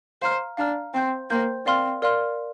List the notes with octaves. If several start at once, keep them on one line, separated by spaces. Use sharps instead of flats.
C5 F5 A#5 F6
D4 F5 A#5 F6
C4 C5 G5 C6 G6
A#3 C5 G5 C6 G6
C4 A#4 D5 F5 C6 F6
A#4 D5 F5 C6 F6